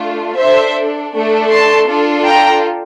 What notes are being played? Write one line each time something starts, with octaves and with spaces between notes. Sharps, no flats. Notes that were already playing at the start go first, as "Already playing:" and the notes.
Already playing: A3 D4 F4
D4 A4 C5 E5
A3 D4 A4
A5 C6
D4 F4 A4
G5 A#5